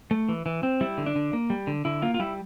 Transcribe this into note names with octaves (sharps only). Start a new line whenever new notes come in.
A3
E3
E3
C4
G3 E4
D3
D4
D3
A#3
G3
D3
D3 E4
A#3 F4
F4
G3 E4